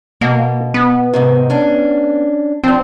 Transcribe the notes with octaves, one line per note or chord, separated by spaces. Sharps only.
B2 A#3
B3
G#2 C3 D#3
C#4 D4
F3 C4 D4